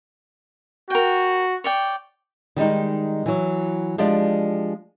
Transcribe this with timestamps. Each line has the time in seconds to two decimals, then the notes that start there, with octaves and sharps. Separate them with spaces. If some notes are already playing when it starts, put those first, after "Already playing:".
0.90 F#4 A#4 G5
1.64 C#5 D5 G5
2.56 D#3 G3 G#3 D#4
3.26 E3 F#3
3.98 F3 G#3 D4 G4 D5